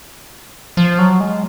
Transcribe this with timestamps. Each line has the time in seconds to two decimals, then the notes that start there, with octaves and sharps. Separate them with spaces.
0.77 F3
0.99 F#3
1.20 G#3